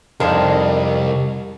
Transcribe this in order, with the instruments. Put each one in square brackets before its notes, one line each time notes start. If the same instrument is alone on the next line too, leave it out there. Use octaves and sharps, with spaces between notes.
[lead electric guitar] C2 [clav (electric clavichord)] F2 [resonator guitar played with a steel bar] G#3 D4 D#4 [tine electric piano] A#4